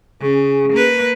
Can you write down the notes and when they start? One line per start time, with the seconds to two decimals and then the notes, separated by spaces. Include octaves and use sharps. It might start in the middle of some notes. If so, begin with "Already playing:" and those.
0.21 C#3 G#4
0.73 A#3 B4